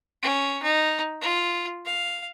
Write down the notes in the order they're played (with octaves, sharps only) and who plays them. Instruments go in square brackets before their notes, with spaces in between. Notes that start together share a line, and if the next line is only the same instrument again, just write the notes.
[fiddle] C#4
D#4
F4
F5